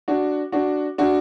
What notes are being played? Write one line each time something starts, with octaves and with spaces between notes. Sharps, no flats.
D4 F#4
D4 F#4
D4 F#4